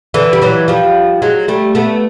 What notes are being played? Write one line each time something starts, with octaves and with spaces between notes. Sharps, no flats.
D3 E3
G3
E3 F#3
F3 G3
F#3 G#3
G3 A3
A3 B3